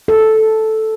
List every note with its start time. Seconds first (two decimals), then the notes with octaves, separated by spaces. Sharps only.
0.08 A4